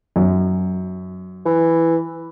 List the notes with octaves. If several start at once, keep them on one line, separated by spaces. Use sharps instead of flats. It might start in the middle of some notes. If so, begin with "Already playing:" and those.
F#2
E3